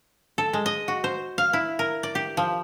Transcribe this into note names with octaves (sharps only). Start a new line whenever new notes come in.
A4
G#3
D#5
F#4
C5
F5
E4
A#4
D5
G4
F3